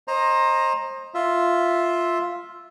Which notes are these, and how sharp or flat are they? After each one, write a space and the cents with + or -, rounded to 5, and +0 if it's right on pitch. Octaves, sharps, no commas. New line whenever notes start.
C5 +30 D#5 +0 A#5 +0
F4 +0 E5 +0